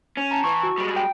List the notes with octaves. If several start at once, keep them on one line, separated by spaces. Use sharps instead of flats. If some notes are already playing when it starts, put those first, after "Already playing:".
C#4
A5 A#5
E3 C#6
F#4
G3 G#3
G5